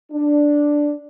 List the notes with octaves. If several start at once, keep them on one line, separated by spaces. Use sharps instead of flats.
D4